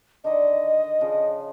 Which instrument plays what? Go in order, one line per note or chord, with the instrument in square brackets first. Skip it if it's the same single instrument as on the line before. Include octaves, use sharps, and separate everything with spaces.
[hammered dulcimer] D3 D#3 [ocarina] D#5
[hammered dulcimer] C#3 F3